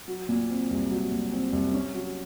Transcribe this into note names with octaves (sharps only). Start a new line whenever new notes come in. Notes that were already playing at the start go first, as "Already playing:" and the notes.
F#3
A#2
C4
C2
F#3
A#2
C4
C2
C#4
F#3